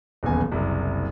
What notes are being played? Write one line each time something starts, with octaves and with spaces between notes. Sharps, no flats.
D#1 B1 E2 C#3 B3 G#5
F#1 C2 F#2